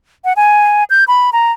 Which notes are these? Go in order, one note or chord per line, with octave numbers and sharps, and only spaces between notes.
F#5
G#5
G6
B5
A#5